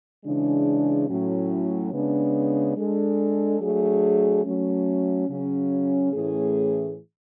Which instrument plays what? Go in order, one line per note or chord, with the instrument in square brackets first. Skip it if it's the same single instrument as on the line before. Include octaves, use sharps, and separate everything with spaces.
[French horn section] C#3 E3 G#3 D4
A2 F#3 C#4
C#3 G#3 B3 D4
G#3 D4 A4
F#3 A3 D4 G#4
F#3 A3 C#4
C#3 F#3 C#4
A2 E3 A3 C#4 G#4